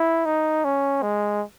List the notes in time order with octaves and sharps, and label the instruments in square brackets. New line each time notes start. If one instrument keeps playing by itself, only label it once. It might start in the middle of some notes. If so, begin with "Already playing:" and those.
Already playing: [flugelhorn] E4
D#4
C#4
G#3